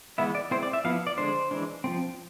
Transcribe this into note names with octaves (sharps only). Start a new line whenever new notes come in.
E3 G#3 B3 E4 E5
D5
G#3 C4 E4 C5
D5
E5
F3 B3 E4 F5
D5
D3 G#3 D4 C5
E3 G#3 D4
F3 A3 C4